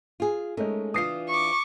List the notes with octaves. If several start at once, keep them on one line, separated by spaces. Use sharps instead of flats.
F4 G#4
G#3 A3 C#4 D#4 A#4
E3 D4 F4 D#6 C7
C#6 D6